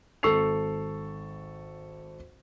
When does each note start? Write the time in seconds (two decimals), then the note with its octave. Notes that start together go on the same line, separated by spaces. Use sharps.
0.23 G#1 A4 C#6 E6 C7 F7